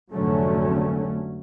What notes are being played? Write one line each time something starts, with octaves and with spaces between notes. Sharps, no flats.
F1 G#2 D3 F#3 A3 C#4